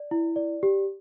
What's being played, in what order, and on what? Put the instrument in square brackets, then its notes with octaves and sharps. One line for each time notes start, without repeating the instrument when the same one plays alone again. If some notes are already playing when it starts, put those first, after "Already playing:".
Already playing: [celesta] D5
E4
D5
G4